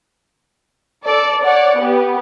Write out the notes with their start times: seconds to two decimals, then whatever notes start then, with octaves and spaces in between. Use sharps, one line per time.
1.05 A4 D5
1.45 C#5 D5 F#5
1.78 B3 G4